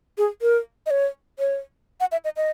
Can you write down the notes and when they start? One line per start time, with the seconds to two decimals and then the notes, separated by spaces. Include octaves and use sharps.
0.18 G#4
0.42 A#4
0.86 D#5
0.91 C#5
1.39 C#5
2.00 F#5
2.12 E5
2.25 D#5
2.37 D#5